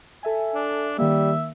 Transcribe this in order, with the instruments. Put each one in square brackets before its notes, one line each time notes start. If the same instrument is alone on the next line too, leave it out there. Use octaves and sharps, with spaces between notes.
[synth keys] A4 E5 G#5
[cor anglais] D4
[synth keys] D#3 A#3 [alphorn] G3 [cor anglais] E5